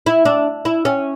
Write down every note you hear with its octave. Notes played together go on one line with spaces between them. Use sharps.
E4
D4
E4
C#4